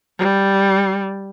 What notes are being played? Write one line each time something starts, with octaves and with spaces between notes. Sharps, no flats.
G3